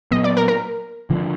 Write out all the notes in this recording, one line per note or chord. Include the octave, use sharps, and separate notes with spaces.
A#2 F#3 B3 D#5
D5
A#4
A#4
D3 F3 A#3 D4